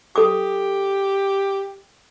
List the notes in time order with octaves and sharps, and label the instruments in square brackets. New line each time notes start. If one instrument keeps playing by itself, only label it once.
[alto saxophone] G4 [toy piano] A4 D6